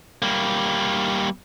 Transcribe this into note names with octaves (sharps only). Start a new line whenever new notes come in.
G3 A#3